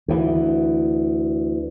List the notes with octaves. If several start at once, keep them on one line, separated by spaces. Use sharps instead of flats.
D2 E3